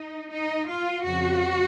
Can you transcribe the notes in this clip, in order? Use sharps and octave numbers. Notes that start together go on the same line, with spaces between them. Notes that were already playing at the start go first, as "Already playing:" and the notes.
Already playing: D#4
D#4
F4
F2 C#3 F3 F#4